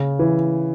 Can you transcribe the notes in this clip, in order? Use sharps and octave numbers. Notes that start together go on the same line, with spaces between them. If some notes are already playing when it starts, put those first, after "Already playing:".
Already playing: C#3
E3